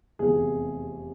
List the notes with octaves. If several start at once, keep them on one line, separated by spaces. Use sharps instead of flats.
F1 E2 C3 G#4